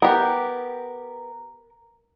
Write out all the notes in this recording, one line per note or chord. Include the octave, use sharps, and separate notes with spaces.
B3 G4 A#4